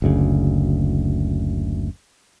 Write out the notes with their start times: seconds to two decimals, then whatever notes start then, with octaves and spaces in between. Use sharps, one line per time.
0.02 F#1 D2 C#3